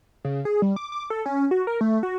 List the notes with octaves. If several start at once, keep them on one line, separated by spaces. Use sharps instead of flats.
C#3
G#4
G3
D6
D6
A4
C#4
F#4
A#4
A3
F#4